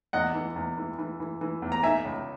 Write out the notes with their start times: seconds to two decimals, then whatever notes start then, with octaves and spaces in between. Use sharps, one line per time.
0.13 E2 D#5 F#5
0.35 E3
0.56 E2
0.77 E3
0.98 E3
1.20 E3
1.41 E3
1.62 E2
1.72 A#5
1.83 D#4 E5 G#5
2.05 C#2